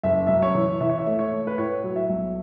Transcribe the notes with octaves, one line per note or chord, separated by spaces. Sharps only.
F#1 E5
F#2 E5
C#5
E3
E3 E5
C#5
E5
A3
C#5
A3
B4
A2 C#5
F#3
E5
B1